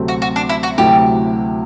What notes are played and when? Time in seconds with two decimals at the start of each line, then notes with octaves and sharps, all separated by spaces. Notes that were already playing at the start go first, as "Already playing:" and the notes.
Already playing: D2 C3 F#3 A3 C4
0.08 F#4
0.22 F#4
0.36 D4
0.49 E4
0.63 F#4
0.77 D2 C3 F#3 A3 E4 G4